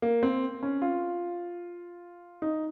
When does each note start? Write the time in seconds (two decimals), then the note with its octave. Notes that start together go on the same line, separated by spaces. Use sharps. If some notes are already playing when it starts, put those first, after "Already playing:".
0.02 A#3
0.23 C4
0.63 C#4
0.82 F4
2.42 D#4